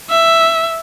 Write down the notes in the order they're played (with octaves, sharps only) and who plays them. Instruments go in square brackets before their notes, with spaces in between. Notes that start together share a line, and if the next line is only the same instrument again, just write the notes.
[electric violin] E5